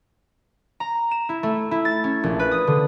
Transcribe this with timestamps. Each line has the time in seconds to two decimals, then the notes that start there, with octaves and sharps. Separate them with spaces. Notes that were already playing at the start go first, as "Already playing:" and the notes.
0.80 A#5
1.11 E7
1.29 E4
1.43 A3
1.71 E4
1.85 A6
2.04 C#4
2.23 A#1
2.39 B4
2.51 D#6
2.67 D3